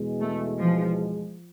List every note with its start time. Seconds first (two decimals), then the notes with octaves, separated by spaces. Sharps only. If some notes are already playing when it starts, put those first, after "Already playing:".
Already playing: E2 B2 G#3
0.21 A3
0.59 F3